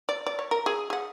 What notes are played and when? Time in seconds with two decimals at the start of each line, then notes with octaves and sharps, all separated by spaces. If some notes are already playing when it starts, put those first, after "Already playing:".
0.09 D5
0.26 D5
0.39 C#5
0.51 A#4
0.66 G#4
0.90 G#4 F#5